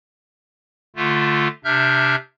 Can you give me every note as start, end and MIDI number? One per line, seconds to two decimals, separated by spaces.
0.96 1.48 50
0.96 1.48 57
0.96 1.48 65
1.65 2.16 48
1.65 2.16 62
1.65 2.16 76
1.65 2.16 89
1.65 2.16 91